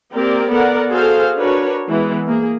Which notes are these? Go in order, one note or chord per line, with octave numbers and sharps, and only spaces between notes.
A#3 C4 G4 A#4 D5
B3 A4 A#4 D5 F#5
F#4 G#4 A4 C5 F5
D4 F#4 A#4 B4 C#5
E3 G#3 B3
A#3 G#4